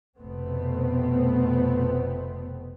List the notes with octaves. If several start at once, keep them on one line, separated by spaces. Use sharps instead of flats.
F1 B2 A3 B3 C4